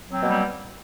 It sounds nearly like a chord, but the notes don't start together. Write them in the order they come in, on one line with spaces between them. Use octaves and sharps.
F#3 C4 A#3 B2 G3